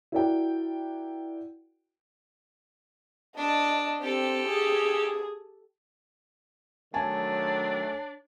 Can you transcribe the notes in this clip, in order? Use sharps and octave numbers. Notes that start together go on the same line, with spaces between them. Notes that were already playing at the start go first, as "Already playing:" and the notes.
E4 F#4 A#4 D5 F#5 G5
D4 D#5 A5
C4 G4 A4
G#4
D#3 F#3 A3 D4 C#5 G#5 A5